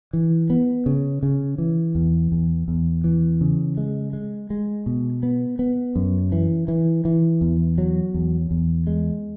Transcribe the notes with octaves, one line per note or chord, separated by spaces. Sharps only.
E3
B3
C#3
C#3
E3
E2
E2
E2
E3
C#3
G#3
G#3
G#3
B2
B3
B3
F#2
E3
E3
E3
E2
F#3
E2
E2
G#3